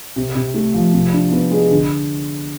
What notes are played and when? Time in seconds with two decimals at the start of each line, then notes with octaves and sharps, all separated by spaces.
0.16 C3
0.35 C3
0.54 A3
0.74 F3
0.93 C3
1.13 D4
1.31 B3
1.51 G#3
1.71 D3